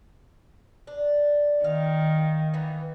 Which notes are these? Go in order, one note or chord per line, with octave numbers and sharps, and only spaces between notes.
D4
D#3 F5
E3 A#3 B3